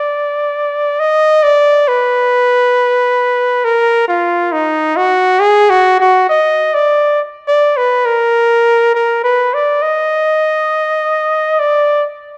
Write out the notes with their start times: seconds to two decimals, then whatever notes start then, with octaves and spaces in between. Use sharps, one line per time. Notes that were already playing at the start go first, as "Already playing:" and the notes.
Already playing: D5
1.00 D#5
1.43 D5
1.88 B4
3.64 A#4
4.08 F4
4.52 D#4
4.97 F#4
5.41 G#4
5.70 F#4
6.00 F#4
6.29 D#5
6.74 D5
7.48 D5
7.77 B4
8.06 A#4
8.94 A#4
9.24 B4
9.54 D5
9.82 D#5
11.59 D5